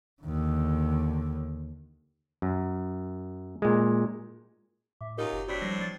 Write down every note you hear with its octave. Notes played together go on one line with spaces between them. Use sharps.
D#2 D3
F#2
A#2 G#3
A2 E5 D6
F#2 D#4 F4 G4 A#4
F#1
A2 C4 D4 F#4 B5 B6
F3 G3 A#6 C7
A6